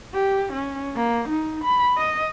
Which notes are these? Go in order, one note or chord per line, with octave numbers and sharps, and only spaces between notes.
G4
C#4
A#3
D#4
B5
D#5